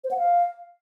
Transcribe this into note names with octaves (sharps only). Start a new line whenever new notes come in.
C5
F#5
F5